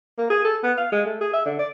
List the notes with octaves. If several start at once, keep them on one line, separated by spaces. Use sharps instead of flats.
A#3
G#4
A4
B3
F5
G#3
A3
G#4
E5
D3
D5